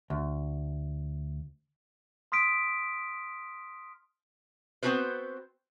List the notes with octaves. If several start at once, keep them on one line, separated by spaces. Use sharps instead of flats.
D2
C6 D#6 F6 B6 D7
B3 C4 D#4 F#4 B4 C5